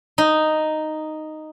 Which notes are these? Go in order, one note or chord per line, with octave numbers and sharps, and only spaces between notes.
D#4